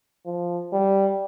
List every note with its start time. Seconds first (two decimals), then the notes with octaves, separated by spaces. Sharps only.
0.26 F3
0.73 G3